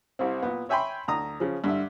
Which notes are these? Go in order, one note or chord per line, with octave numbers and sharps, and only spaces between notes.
C2 C3 C4
A#2 B3
C#5 E5 G5 G#5 B5 C6
D2 A#5 D#6
C#3 F3
G2 D3 E5